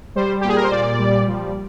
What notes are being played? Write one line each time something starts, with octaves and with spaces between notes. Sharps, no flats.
G3 C5
G4
A#2 G#4
A#4
C5
A#2 D5
G3
F3